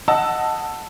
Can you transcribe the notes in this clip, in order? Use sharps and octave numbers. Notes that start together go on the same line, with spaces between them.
D#5 F#5 A5 E6